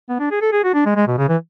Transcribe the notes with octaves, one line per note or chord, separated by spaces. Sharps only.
B3
D4
G#4
A4
G#4
F#4
D4
G#3
G#3
B2
C#3
E3